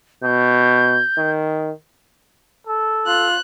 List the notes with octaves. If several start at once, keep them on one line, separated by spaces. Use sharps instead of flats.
B2 G6
D#3
A4
F4 F#6